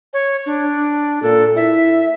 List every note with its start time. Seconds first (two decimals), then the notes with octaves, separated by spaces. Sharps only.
0.14 C#5
0.46 D4
1.22 A#2 A4
1.56 E4 E5